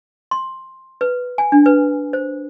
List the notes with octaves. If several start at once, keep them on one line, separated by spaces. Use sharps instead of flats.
C6
B4
G#5
D4
B4
C5